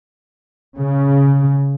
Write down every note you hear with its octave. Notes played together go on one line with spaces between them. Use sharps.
C#3